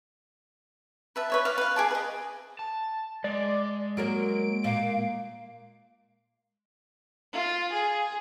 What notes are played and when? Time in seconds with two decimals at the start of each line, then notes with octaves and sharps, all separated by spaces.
1.16 B4 E5 A5
1.30 B4 C#5 E5
1.45 D5 F5
1.58 B4 F5
1.76 G#4 D5 A5
1.91 B4 D#5
2.59 A5
3.24 G#3 D5
3.97 F#3 A#3 A#4 D7
4.64 A#2 F5
7.33 F4
7.72 G#4